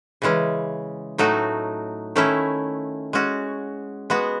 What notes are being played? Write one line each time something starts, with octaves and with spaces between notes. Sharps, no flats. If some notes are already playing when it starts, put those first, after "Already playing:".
C#3 E3 G#3 C#4
A2 F#3 A3 D#4 F#4
D#3 A3 C#4 E4
G#3 C#4 F#4
G#3 B3 F#4